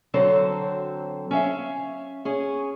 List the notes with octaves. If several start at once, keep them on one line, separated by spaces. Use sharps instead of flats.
D3 F#3 C4 A4 C5
C#4 E5 F5
C#4 G#4